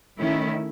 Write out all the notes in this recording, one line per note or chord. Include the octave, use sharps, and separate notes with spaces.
D#3 A3 C#4 E4